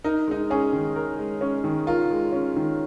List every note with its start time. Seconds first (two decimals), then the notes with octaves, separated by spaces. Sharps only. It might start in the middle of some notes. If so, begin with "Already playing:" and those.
0.04 D#4 A#4
0.28 G#3 D#4
0.50 C#4 G#4
0.73 D#3
0.96 A#4
1.19 G#3
1.41 C#4
1.64 D#3
1.87 F4 A#4
2.11 G#3
2.32 C#4
2.56 D#3